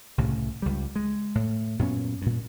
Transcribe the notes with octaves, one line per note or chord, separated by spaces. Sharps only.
C2 A2 C#3
C#2 G3
G#3
A2
F#2 A#2 B3 C#4
G2 A#2